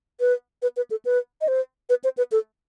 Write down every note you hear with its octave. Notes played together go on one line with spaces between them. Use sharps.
B4
B4
B4
A4
B4
D#5
C5
B4
C5
B4
A4